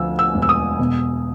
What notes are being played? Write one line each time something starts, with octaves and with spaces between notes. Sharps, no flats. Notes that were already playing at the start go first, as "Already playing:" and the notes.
Already playing: D2 F3 E6
E6
E1
E6
D#6
B2